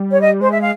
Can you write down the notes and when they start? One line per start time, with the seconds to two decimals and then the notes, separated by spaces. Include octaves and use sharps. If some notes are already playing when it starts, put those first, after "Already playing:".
Already playing: G3
0.11 C#5
0.21 D#5
0.41 G#3 C5
0.52 E5
0.61 F5